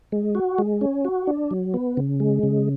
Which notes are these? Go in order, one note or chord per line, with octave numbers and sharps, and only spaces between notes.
G#3
F#4
G#3
C#4
F#4
D4
F#3
B3
C#3
G#3
C#3